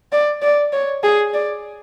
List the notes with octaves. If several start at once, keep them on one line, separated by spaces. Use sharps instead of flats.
D5
D5
C#5
G#4
D5